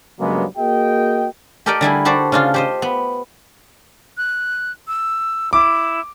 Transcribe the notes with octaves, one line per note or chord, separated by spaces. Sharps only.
G2 C#3 F#3 G#3 A#3 B3
A#3 F#4 G#4 D#5 G5
G4 A4 A#4 D5 D#5 G5
D3 G3 E4 G#4
F#4 G4 A4 C5 D5
C#3 D4 F4
G4 C5 D#5
B3
F#6
E6
E4 D6